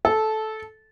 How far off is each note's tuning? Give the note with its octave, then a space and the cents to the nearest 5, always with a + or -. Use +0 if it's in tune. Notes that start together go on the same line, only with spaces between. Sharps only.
A4 -15